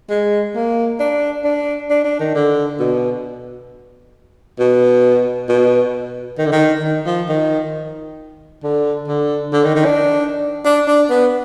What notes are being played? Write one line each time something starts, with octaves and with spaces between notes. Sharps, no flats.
G#3
A#3
D4
D4
D4
D4
D#3
D3
B2
B2
B2
D#3
D3
D#3
D#3
F3
D#3
D3
D3
D3
D#3
D#3
D4
D4
D4
B3